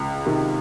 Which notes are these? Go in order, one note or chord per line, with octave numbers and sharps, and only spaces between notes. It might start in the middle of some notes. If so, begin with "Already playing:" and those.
Already playing: C#2
C3 D#3